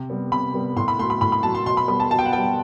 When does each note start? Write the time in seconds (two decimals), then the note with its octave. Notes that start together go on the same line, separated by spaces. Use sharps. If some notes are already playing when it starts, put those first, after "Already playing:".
Already playing: C3
0.10 G3 B3
0.32 C3 B5
0.54 G3 B3
0.76 A2 C6
0.88 B5
0.99 F#3 A3 C6
1.10 B5
1.21 A2 B5
1.32 B5
1.43 F#3 A3 A5
1.55 C6
1.66 B2 C6
1.77 B5
1.88 G3 B3 B5
2.00 A5
2.10 B2 A5
2.19 G5
2.25 F#5
2.33 G3 B3 G5